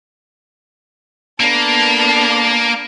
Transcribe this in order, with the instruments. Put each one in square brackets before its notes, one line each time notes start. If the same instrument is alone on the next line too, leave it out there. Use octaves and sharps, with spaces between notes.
[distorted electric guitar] A#3 [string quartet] B3 D4 A4